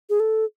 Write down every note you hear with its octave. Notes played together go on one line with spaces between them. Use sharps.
G#4
A4